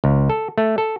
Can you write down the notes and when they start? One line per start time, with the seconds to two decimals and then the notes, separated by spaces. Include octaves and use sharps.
0.04 C#2
0.30 A4
0.58 A3
0.78 A4